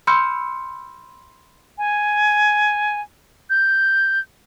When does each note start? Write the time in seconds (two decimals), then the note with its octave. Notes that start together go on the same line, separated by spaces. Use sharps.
0.07 B5 C6 E6 F6 G6 C#7
1.78 G#5
3.50 G6